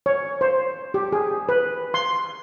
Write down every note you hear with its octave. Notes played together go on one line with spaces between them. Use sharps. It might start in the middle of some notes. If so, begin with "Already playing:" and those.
C#5
C5
G4
G#4
B4
C6